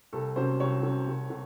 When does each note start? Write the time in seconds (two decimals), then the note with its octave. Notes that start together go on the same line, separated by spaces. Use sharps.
0.13 C2 A4
0.36 C3 F#3 C#4 C5
0.60 C2 C#5
0.83 C3 F#3 C#4
1.07 C2
1.30 C3